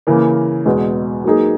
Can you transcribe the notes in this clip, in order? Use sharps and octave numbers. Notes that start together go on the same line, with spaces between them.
C#3 E3 A#3
E2 B2 G#3
F#3 A#3 D#4 G#4